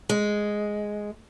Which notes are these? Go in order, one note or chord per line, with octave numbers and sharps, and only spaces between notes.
G#3